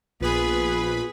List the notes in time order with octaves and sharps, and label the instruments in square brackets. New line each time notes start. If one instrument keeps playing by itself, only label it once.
[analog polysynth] A#1 B4 B5 [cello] B3 G#4 [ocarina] F4